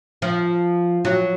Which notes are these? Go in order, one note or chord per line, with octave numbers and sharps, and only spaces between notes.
F3
F#3